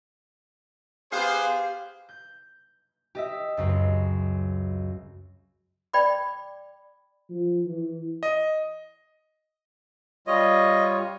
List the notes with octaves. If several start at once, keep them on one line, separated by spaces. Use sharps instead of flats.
B3 G4 G#4 C5 F5
G6
G4 D#5 E5
C#2 F#2 C4
D5 G5 B5 D6
F3
E3
D#5
G3 F4 C#5 D#5